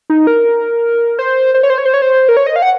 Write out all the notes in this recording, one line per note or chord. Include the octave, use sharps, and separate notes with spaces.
D#4
A#4
C5
C5
C#5
C5
C#5
C5
C#5
C5
A#4
C#5
D#5
F5
F#5